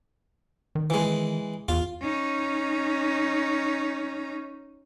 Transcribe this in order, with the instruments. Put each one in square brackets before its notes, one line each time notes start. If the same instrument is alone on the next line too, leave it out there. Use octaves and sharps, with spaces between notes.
[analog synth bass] D#3
[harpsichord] E3 G#3
[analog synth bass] E2 [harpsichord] F4
[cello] C#4 D#4